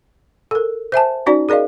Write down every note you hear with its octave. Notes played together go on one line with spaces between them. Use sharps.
A4 A#4
C5 E5 G#5 A5
C#4 D#4 F#4 D5
G#4 A#4 D5 D#5 F5